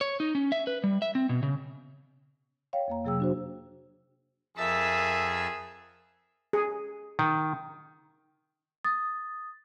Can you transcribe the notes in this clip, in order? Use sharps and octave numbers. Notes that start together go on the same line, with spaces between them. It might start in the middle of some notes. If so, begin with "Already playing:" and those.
C#5
D#4
C#4
E5
B4
G3
E5
C4
B2
C#3
C#5 F5 G5
F2 A#3 A#5
C3 F#3 G#4 G5 E6
D4 F#4 C5
F2 G#4 A#4 E5 A5 E6
G#4
D#3
D#6 A6